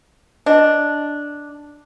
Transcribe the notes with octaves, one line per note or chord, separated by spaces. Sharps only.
D4 D#5